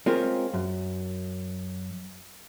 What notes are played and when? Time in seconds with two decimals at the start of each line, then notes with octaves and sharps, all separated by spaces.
0.06 G#3 C4 C#4 F4 A#4
0.53 F#2